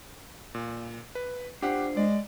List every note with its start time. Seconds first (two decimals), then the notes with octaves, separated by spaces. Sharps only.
0.55 A#2
1.15 B4
1.62 D4 F4 G4 C5 F#5
1.97 G#3 D5